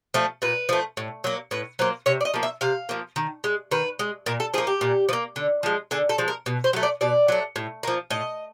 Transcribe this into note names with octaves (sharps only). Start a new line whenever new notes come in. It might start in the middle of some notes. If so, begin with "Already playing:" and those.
F3 A3
A#2 B4
F3 A3
A2
F#3 A#3
A2 B4
F#3 A#3 C5
C3 C#5
D5
D#5
F3 A#3
E5
C3 F5
F3 A#3
D#3
G#3
D#3 B4
G#3
A#2 A#4
A4
F3 A#3 G#4
G4
A#2
F3
A#3
D3
F3 G#3
D3 G#4
A4
F3 G#3
A#4
B2
C5
F#3 A3
D5
B2 D5
F#3 A3
A2
F3 A#3
A2 D#5